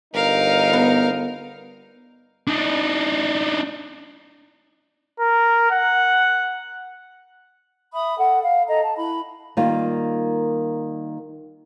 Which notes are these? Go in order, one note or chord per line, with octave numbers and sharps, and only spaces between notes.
G1 D#4 A#4 F5
B3
D4 D#4
A#4
F#5
E5 B5 D#6
A4 F#5
F5
A4 D#5 A#5
A5
E4 B5
D#3 G3 A#3 F4